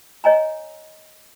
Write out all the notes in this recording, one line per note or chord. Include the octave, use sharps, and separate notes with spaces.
C#5 D#5 G#5 A#5